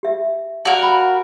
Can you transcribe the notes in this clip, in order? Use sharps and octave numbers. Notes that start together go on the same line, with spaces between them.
G4 E5
F#4 A#4 D5 F5 A5
G5 B5